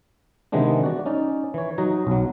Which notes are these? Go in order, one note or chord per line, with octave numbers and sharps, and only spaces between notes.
C3 D#3 E3 G#3 B3 D4
F#4 D5
C#4 D#4 D5
E3 C#5
F#3 D#4 F#4 D#5 A#5
B1 F#3